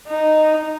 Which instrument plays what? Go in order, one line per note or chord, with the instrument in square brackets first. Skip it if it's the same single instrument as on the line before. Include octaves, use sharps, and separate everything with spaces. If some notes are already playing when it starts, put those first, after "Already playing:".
[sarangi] D#4